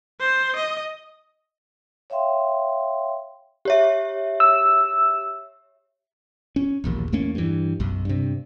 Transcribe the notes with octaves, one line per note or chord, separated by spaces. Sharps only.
C5
D#5
C#5 E5 F5 G5 C6
G4 C#5 E5
E6
C#4
E1 A#1 D#2
E2 A3 A#3 C#4
G2 E3
B1 F#2
G2 C3